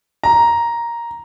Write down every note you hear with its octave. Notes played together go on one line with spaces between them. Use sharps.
A#5